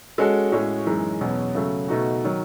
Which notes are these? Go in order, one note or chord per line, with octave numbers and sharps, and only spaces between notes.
G#3 C#4 F#4 A4
A2 G#3 C#4 F#4 C#5
F#2 E3 G#3 D#4
E2 B2 F#3 C#4
C#3 F#3 A3
B2 A3 D#4 F#4
D#3 F#3